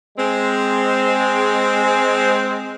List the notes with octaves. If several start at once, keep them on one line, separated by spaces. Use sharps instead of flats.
G#3 C4